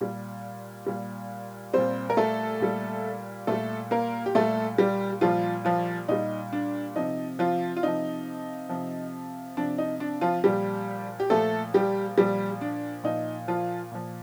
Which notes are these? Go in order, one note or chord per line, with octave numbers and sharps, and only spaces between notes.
A#2 G3
A#2 G3
A#2 G3 C4 C5
A#4
A3 A4
A#2 G3
A#2 G3 A3 A4
A#3 A#4
G4
A#2 G3 A3 A4
G3 G4
A#2 F3 G3 F4
F3 F4
A#2 G3 D#4
D4
C3 F3 D#4
F3 F4
F4
C3 F3 D#4
C3 F3
C3 F3 D4
D#4
D4
F3 F4
A#2 F3 G3 G4
G4
A#2 F3 A3 A4
G3 G4
A#2 F3 G3 G4
D4
A#2 F3 D#4
F3 F4
A#2 F3